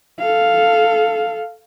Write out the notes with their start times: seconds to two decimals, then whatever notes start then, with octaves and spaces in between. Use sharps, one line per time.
0.19 A4 F5